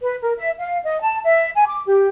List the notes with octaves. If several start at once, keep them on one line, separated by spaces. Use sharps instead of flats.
B4
A#4
E5
F5
D#5
A5
E5
G#5
D6
G4